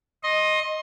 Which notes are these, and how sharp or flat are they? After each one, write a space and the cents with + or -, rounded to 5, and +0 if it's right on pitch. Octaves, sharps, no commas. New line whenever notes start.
D#5 +0 C6 +30